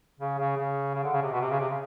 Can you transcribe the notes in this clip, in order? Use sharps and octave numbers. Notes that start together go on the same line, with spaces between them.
C#3
C#3
C#3
C#3
D3
C#3
C3
B2
C3
C#3
C3
C#3